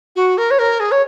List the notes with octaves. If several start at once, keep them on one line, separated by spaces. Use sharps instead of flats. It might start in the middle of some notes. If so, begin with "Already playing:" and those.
F#4
A#4
C#5
A#4
G#4
C#5